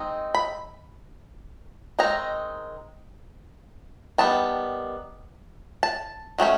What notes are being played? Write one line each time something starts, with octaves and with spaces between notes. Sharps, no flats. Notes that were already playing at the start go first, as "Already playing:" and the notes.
Already playing: G#3 C4 D#4
B5
D#3 G#3 C4 D#4 A#5
D#3 G3 B3 A5
A5
D#3 F#3 A3 C#4